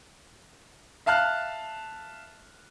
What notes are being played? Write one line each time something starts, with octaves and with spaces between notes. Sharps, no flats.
E5 F5 A5 F6 F#6